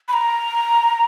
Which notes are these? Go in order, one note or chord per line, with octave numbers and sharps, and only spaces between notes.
B5
A#5